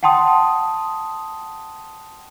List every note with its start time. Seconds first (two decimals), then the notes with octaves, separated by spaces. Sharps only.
0.03 F#5 G5 A5 C6 D#6